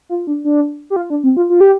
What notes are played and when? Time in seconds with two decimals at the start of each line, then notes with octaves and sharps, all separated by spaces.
0.09 F4
0.27 D4
0.45 D4
0.90 G4
0.96 F4
1.10 D4
1.24 C4
1.37 F4
1.50 F4
1.60 G4